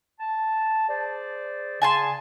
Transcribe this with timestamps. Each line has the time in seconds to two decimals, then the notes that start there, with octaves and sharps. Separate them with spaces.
0.20 A5
0.89 G#4 C5 D5
1.82 C#3 G#5 A5 C6